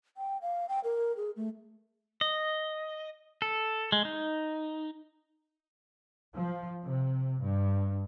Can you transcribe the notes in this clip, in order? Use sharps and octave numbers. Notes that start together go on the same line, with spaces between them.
G5
F5
G5
A#4
G#4
A3
D#5
A4
G#3
D#4
F3
C3
G2